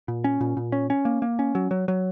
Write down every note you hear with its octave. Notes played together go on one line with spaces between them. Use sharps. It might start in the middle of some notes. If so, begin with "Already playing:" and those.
A#2
C#4
A#2
A#2
C#4
C#4
A#3
A#3
C#4
F#3
F#3
F#3